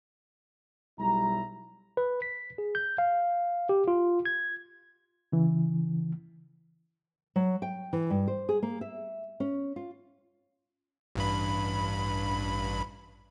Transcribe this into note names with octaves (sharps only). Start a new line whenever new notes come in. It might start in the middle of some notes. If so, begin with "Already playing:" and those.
B1 G3 E4 A#5
B4
B6
G#4
G6
F5
G4
F4
G#6
C#3 E3
F#3
G5
E3
G2
C5
G#4
A#3
E5
C#4
F4
A1 G2 B5